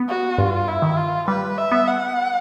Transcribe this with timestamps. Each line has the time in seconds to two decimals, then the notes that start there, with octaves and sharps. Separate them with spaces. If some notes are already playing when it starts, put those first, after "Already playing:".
Already playing: B3
0.09 F#4
0.38 G2 F4
0.68 E4
0.82 D#3
0.97 F4
1.28 G3 B4
1.58 E5
1.72 B3
1.88 F#5